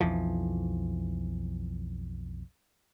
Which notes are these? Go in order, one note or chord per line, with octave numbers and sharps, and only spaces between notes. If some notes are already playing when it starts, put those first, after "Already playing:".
B1 F2 E3 F3